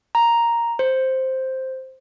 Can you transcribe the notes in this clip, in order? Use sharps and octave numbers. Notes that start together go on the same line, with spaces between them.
A#5
C5